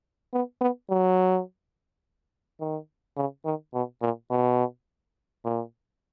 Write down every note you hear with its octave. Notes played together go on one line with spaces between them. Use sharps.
B3
B3
F#3
D#3
C#3
D#3
B2
A#2
B2
A#2